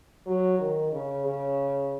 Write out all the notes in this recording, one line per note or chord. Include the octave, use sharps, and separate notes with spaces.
F#3
D#3
C#3
C#3